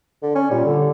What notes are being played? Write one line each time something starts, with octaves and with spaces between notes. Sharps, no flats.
D3
C#4
A#2 G3
D3